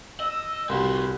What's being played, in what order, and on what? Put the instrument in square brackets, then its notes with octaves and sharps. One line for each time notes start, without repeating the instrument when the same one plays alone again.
[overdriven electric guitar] D#5 [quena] E6
[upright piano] C2 [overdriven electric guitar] C4 F#4 [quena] C6